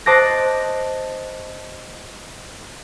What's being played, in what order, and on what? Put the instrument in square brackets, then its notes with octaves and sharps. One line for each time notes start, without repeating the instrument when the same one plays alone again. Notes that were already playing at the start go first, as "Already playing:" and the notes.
[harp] C5 D#5 A5 D6 F#6 A#6